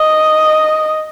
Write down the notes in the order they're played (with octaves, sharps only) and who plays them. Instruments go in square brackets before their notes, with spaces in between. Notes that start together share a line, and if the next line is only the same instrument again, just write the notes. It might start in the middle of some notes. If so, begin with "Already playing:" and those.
Already playing: [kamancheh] D#5